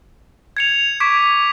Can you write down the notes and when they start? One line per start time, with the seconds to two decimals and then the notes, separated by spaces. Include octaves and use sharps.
0.57 G#6 C#7 F7
1.00 C#6 D6 G#6 B6 D7